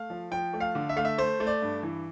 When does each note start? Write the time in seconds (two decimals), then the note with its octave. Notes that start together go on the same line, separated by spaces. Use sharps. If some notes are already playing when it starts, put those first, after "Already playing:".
Already playing: A3 F5
0.10 F3
0.31 F3 G5
0.54 A3
0.60 F5
0.75 D3
0.89 E5
0.97 A3 F5
1.05 E5
1.18 A3 C5
1.40 A3
1.47 D5
1.62 G2
1.83 E3